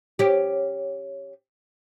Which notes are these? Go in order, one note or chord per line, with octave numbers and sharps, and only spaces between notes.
C#4 G4